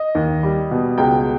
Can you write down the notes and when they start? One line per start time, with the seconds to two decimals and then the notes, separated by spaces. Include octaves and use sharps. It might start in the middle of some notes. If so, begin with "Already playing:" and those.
Already playing: D#5
0.15 D#2
0.43 G3
0.71 B2
0.98 C#2 G5